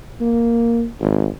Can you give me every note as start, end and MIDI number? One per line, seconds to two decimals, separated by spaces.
0.21 0.86 58
1.00 1.28 32